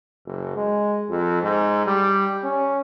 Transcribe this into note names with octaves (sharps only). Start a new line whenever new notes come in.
F#1
G#3
F2
G#2
G3
C#4